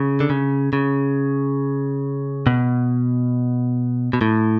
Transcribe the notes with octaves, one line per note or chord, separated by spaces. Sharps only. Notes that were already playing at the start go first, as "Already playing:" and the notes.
Already playing: C#3
D3
C#3
C#3
B2
B2
A2